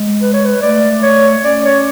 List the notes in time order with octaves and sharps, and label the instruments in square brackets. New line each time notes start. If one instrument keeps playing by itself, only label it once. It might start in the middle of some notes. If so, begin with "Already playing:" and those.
Already playing: [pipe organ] G#3
[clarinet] B4
C#5
B4
[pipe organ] A3 [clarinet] D5
[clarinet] C#5
[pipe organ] C#4 [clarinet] D5
[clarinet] C#5